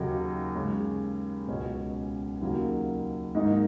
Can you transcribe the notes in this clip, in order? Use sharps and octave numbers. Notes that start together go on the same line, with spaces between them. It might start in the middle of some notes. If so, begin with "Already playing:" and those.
Already playing: D#2 C#3 F#3 A#3 D#4
C#3 G#3 C#4
C#2 B2 G#3 C#4
D#2 C#3 F#3 A#3
G#2 D#3 A#3 D#4